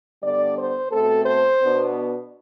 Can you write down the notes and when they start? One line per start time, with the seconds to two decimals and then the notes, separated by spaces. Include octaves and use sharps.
0.23 D3 G3 B3 D4 D5
0.57 C5
0.91 B2 A3 C4 A4
1.26 C5
1.60 B2 B3 D4